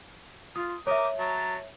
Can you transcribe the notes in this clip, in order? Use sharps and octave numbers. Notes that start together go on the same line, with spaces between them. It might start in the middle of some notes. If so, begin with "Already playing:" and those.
F4 D#6
A#4 C#5 E5 D6 D#6
F#3 A5 A#5